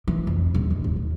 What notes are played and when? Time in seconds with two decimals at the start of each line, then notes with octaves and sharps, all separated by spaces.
0.08 E3
0.27 F2
0.54 D#1
0.71 D3
0.84 D#2
0.96 D#2